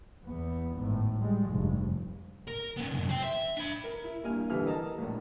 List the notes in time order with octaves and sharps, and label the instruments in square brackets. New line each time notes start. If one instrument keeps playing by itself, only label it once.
[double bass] E2 B3
G#1 A2
G3 G#3
F1 G2
[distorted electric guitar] A#4
B3 C#4
C2 F#2
C5 G5
E5
D4 B5
[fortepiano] A#4
E4
G2 A#3 G#5 F6
D3 E3 G3 B4 F6
A4 A#4 D#5 A5 A#5
A#1 A2